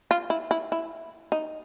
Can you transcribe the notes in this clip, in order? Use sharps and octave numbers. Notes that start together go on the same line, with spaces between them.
F4
E4
E4
E4
D#4